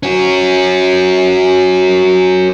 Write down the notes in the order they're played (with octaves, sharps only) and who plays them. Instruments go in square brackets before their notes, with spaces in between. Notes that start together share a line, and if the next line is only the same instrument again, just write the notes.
[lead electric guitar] C#4 F#4